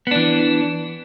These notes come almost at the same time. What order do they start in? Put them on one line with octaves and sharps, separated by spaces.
B3 D4 E3